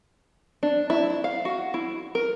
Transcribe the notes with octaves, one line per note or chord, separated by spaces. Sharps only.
D4
E4
E4
F5
F#4
E4
A#4